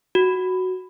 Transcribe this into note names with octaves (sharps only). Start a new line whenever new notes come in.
F#4